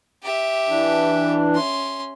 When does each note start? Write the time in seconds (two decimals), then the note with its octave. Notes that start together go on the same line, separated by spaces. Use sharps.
0.23 G4 E5
0.68 E3 D4
1.54 C#4 C6